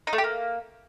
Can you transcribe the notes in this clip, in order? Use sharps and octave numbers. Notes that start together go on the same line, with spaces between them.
D#4
A3
G4
A#3